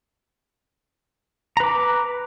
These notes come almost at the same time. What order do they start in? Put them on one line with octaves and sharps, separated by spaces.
A#5 B4 D6